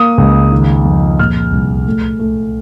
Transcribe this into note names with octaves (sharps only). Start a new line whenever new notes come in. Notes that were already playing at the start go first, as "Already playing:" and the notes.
Already playing: A#3 D#6
C#2
D#3
F2
A#2 F6
C2
A3
A3